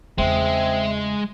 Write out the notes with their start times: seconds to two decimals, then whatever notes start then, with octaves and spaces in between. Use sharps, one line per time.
0.18 E2 C#3 G#3 C4 E5